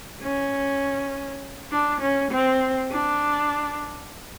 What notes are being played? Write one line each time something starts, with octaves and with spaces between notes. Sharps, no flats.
C#4
D4
C#4
C4
D4